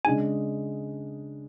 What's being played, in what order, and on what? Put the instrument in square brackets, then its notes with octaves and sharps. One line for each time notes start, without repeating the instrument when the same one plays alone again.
[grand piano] C#3 G#3 D4 G#4 [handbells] G#5